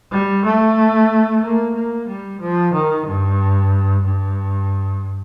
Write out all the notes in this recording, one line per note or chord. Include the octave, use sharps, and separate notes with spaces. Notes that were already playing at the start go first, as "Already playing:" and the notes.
G3
A3
A#3
A#3
G3
F3
D#3
G2
G2